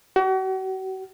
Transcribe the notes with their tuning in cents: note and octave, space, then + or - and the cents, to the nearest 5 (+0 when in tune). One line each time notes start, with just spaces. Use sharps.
F#4 +40